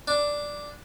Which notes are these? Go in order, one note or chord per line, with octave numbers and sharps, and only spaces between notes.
D4